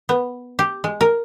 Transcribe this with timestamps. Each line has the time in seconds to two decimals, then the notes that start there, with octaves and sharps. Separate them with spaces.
0.09 B3
0.59 G4
0.84 G#3
1.01 A#4